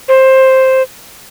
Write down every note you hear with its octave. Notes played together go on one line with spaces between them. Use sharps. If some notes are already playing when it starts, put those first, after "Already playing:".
C5